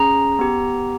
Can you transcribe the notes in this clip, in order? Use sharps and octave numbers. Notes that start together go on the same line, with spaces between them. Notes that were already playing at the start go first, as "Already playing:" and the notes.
Already playing: C#4 G#4 A#5
B3 G4